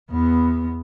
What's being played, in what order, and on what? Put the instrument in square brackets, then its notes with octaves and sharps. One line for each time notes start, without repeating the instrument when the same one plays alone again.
[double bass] E2 B3